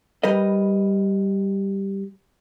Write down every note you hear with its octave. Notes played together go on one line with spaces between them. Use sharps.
G3 A#4 B4 D#5